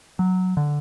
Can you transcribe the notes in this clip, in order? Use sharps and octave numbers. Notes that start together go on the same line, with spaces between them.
F#3
D3